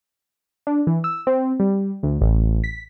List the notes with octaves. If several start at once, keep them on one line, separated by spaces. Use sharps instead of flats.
D4
E3
E6
C4
G3
D2
A1
B6